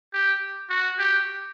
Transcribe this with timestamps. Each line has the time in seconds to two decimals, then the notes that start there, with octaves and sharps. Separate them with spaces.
0.14 G4
0.70 F#4
0.98 G4